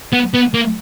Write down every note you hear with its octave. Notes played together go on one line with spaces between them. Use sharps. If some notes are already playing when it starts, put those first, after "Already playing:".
B3
B3
A#3